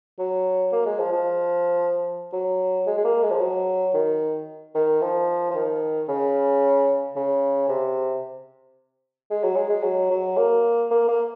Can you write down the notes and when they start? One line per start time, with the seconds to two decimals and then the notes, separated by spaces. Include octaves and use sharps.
0.19 F#3
0.72 A#3
0.86 G#3
0.99 F3
1.12 F3
2.33 F#3
2.87 G#3
2.98 G#3
3.04 A#3
3.23 G#3
3.31 F3
3.40 F#3
3.94 D#3
4.75 D#3
5.01 F3
5.51 F3
5.54 D#3
6.08 C#3
7.16 C#3
7.69 C3
9.30 G#3
9.44 F#3
9.56 G#3
9.69 G#3
9.83 F#3
10.11 F#3
10.37 A#3
10.91 A#3
11.08 A#3